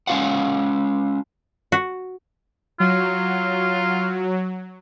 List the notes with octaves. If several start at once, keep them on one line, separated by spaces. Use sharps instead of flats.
G#3 C#4 D#4 F4 F5 F#5
F#4
F#3 F4